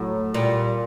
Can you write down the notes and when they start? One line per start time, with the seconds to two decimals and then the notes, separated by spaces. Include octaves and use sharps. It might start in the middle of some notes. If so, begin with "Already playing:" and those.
Already playing: A2 F#3
0.34 A#2 G3